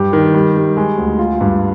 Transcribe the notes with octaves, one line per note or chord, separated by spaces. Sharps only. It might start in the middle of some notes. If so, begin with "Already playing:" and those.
Already playing: G2 G4
D#3
G3
G3
G#3
D2
F4
G2